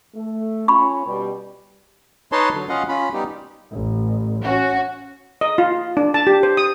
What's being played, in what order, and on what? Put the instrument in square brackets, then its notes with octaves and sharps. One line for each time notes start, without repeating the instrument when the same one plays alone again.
[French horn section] A3
[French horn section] C#4 F4 [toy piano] B5 C#6
[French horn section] B2 G3
[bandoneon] D#4 B4 C#5 D#5 A5 C6
D3 F#3
C#4 F4 D#5 F5 F#5
C#4 F4 B5
G3 B3 D#4 G4
[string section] A1
C#4 F#4
[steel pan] D#5
F4
D4
A5
G4
C5
D#6